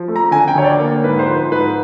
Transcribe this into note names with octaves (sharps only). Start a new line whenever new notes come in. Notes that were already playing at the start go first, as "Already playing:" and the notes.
Already playing: F3
A3
A#5
D3 G#5
G5
D2 C#5
D5
A#3
G#2 B4
C5
F3 B4
G#2 B4